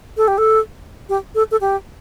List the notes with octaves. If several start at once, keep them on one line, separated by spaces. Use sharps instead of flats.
A4
G4
A4
G4
A4
A4
G4